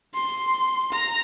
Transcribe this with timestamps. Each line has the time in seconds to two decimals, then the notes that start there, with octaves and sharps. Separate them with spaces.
0.14 C6
0.92 A#5